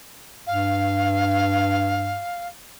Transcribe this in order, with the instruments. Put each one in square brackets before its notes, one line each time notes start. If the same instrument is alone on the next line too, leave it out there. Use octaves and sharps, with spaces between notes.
[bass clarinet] G2 [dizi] F5